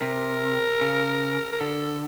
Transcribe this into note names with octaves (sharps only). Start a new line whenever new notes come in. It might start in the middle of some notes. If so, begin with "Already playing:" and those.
C3 A#4
C#3
A#4
D3 A4